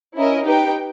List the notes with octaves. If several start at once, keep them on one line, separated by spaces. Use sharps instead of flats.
C#4 E4 A#4 D#5
D#4 G4 B4 G5